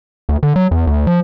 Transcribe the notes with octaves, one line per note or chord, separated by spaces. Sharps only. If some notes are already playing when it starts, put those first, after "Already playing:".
D2
D3
F#3
E2
D2
F3